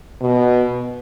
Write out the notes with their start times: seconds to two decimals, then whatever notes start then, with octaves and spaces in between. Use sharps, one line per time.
0.21 B2